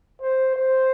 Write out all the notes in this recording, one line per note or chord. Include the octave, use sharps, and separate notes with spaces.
C5
C5